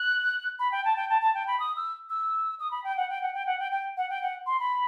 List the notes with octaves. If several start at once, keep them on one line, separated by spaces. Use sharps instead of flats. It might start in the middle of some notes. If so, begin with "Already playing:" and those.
Already playing: F#6
B5
G5
A5
G5
A5
A5
G5
B5
D#6
E6
E6
D#6
B5
G5
F#5
G5
F#5
G5
F#5
G5
G5
F#5
G5
F#5
C6
B5